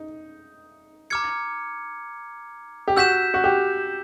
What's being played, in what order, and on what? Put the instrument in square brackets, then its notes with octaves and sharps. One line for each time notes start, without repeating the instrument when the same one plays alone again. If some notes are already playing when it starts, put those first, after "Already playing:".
Already playing: [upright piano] D#4
[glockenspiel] A#5 D6 F6 G#6 C#7
[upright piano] G4
[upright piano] F#4 [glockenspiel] E6 G6 B6 E7
[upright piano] F#4
G4